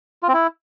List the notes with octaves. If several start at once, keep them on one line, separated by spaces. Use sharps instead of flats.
F4
C4
E4